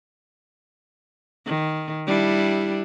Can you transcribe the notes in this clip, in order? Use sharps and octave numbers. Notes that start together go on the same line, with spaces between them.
D#3
G3 D4 E4